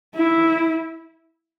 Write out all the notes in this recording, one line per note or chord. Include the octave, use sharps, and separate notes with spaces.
E4